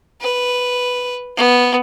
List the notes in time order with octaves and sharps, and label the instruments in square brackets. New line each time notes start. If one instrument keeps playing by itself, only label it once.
[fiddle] B4
B3